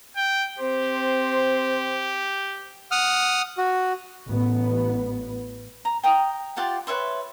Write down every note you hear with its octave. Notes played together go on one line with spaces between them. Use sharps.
G5
C4 G4 C5
F#5 D#6 F6
F#4
A1 B3
A#5
G5 A#5 D#6
F4 G4 D5 F#5
B4 C#5 E5 C6